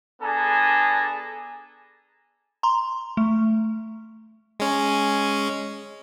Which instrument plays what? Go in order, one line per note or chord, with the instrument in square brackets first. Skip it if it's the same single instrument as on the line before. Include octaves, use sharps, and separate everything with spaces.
[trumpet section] B3 D4 G#4 A4 G#5 A#5
[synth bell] A#5 C6
A3
[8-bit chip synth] G#3 C#4